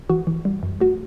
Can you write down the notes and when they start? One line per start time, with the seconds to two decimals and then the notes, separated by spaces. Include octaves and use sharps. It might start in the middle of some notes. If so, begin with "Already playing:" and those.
Already playing: G1
0.10 E3 F#4
0.27 E3
0.45 G3
0.63 F#2
0.80 A3 F#4